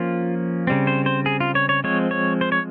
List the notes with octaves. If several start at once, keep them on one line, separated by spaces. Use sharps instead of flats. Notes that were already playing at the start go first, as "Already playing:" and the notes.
Already playing: F3 A#3 C#4 F4
C#3 G3 C4
C5
C5
G#4
F4
C#5
C#5
F3 G#3 C4 C#5
C#5
C5
C#5